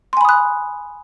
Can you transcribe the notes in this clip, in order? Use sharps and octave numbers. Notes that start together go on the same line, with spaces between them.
G#5 B5 C6 D#6 F#6